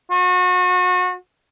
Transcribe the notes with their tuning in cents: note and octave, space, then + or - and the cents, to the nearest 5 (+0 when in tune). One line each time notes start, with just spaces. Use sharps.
F#4 -30